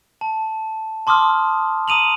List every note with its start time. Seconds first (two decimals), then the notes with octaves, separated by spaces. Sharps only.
0.21 A5
1.07 A5 C6 D6 D#6 F6
1.88 A#5 D#6 D#7 F7 F#7